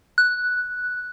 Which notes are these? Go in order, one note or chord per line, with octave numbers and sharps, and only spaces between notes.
F#6